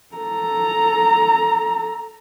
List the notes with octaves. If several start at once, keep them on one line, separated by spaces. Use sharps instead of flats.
A4 A#5